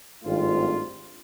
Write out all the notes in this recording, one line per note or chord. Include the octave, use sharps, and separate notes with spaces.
G#1 G2 A3 C4 F4